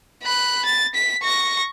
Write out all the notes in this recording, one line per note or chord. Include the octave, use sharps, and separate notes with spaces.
B5 F#6
A6
B6
C#6 A#6